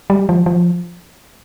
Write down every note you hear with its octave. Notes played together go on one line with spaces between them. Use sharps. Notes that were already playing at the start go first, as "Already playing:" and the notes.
G3
F3
F3